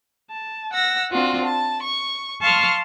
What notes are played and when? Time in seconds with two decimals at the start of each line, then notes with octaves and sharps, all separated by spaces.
0.31 A5
0.74 F#5 E6 A#6
1.11 C4 D4 F4 F#4
1.46 A5
1.82 C#6
2.41 F5 A5 C6 C#6 D#6 F6